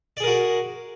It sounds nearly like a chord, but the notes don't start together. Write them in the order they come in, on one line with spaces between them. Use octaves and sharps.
D5 G#4 A#4 F#4